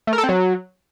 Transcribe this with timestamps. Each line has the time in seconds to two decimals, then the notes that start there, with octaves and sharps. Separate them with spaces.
0.07 A3
0.13 A#4
0.18 A4
0.23 C4
0.29 F#3